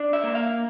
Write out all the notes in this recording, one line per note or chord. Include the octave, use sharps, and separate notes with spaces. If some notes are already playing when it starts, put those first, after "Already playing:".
Already playing: D4
E5
A#3
F5